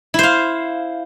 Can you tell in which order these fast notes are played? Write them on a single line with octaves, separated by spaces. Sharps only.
E4 C5 F5